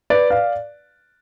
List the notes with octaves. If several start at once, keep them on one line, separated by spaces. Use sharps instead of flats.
B4 D5
D5 F5